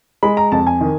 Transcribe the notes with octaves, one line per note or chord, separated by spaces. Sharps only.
G#3 B5
A#5
F2 A5
G#5
D#3